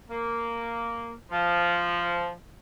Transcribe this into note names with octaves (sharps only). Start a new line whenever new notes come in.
A#3
F3